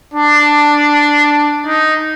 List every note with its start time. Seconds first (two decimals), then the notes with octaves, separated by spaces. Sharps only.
0.14 D4
1.67 D#4